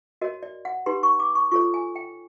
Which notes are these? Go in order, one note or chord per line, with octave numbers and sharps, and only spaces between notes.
F#4 A#4 C#5 D#5
D5
F#5
D#4 G4 B4 C6
C#6
D6
C#6
F4 A4 C#5 C#6
G#5
G5